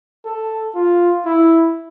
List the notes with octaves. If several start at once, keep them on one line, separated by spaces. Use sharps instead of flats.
A4
F4
E4